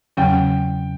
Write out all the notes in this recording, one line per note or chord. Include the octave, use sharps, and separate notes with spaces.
E2 C#3 F#3 C#4 G5